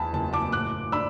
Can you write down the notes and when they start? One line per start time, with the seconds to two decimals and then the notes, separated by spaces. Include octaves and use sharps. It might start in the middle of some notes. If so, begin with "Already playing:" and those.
Already playing: E2 A5 B5
0.13 F#1 A5
0.33 A5 D6
0.52 A2 D6 F#6
0.92 D4 B5 E6